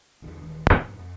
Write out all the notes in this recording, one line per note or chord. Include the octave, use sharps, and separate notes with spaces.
B1 E2 D3
D#1 D#3 E3 G#3
G#2 B2 F3 A3
F2